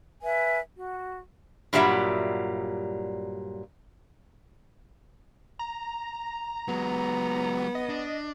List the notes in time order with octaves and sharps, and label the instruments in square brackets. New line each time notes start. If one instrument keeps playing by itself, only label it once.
[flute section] B4 E5 G#5
F#4
[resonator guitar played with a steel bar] G2 A#2 F#3 G3 E5 F#5
[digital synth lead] A#5
[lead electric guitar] F#3 G#3 [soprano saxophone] B3
[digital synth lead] D#5
[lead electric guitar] D4